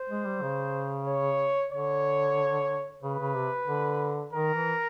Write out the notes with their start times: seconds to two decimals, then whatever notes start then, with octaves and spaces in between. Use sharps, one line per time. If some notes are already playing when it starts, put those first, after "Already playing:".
Already playing: C5
0.10 G#3
0.26 G3
0.42 C#3
1.08 C#5
1.73 D3 C#5
3.03 C#3 B4
3.19 C#3
3.35 C3
3.67 D3
4.33 D#3 A#4
4.55 E3